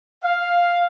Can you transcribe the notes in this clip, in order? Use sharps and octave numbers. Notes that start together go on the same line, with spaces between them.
F5